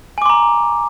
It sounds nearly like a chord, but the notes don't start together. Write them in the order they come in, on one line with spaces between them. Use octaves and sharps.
G#5 D6 C6 A#5